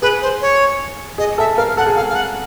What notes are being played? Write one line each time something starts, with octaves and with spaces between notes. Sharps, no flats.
G#4 B4
C5
C#5
G#4 D#5
A4 E5
A#4 F5
A4 F#5
G#4
A4 F5
F5
F#5